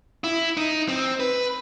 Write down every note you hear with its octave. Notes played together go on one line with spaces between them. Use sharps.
E4
D#4
C4
B4